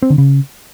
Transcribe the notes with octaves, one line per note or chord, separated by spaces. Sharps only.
C4
D3
C#3